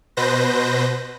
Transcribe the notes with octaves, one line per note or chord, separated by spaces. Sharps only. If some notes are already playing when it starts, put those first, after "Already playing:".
B2 B4 C5 G6 A#6